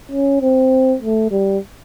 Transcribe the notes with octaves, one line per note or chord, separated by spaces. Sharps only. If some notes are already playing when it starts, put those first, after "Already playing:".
C#4
C4
A3
G3